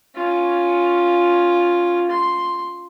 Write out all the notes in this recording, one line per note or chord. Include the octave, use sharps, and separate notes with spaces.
C#4 F4
C6